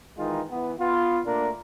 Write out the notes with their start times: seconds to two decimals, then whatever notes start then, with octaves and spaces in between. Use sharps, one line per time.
0.18 D#3 E3 G#3 D#4 F4
0.50 E3 B3
0.79 B3 F4
1.26 A#2 A3 A#3 D4 A#4